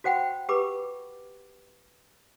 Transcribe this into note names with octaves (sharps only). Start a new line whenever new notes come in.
F#4 C5 F#5 G5 B5
G4 B4 B5 D6